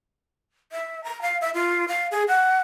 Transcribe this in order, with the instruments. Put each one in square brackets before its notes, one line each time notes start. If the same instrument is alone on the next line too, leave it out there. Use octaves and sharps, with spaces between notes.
[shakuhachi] E5
A#5
F5
E5
F4
F5
G#4
F#5